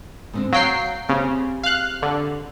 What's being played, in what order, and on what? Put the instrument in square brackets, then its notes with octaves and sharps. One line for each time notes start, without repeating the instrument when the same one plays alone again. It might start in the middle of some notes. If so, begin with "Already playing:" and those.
[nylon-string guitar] G#2 D3 C4
[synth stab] F#3 G5 C7 [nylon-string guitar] F5
[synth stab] C#3 [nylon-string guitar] C4 G4 G#4
[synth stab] F5 F#6
D3